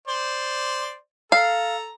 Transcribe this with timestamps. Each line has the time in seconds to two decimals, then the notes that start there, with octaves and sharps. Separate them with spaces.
0.08 C5 D5
1.32 A4 F5 A#5